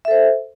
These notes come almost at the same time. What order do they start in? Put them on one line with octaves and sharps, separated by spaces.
E5 A4 C5